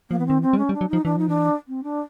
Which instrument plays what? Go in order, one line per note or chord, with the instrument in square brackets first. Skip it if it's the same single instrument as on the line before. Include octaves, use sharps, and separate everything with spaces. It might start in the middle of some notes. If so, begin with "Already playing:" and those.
[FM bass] F3 [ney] A#3
[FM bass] E3 [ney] B3
[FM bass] D#3 [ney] C4
[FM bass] E3
[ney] C4
[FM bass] G3
[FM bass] G#3 [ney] C#4
[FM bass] G3
[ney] D4
[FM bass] F#3
[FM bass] F3 [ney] D#4
[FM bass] E3 [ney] D4
[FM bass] F3 [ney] D#4
[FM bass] E3 [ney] D4
[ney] C4
D4